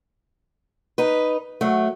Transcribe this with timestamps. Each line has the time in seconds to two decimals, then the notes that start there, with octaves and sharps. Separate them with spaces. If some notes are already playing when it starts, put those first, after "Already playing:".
0.98 D#4 B4
1.61 F#3 A3